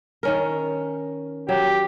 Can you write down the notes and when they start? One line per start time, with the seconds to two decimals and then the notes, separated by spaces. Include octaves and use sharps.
0.23 D#3 C#4 A#4
1.49 F#3 G4